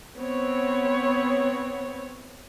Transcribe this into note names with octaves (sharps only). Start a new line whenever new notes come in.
B3 C4 C#5